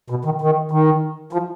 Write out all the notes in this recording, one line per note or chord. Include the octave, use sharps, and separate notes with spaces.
B2
D#3
D#3
D#3
F3